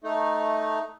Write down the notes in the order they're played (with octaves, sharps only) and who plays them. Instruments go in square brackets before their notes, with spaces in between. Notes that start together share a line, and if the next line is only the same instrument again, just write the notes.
[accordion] A3 D#4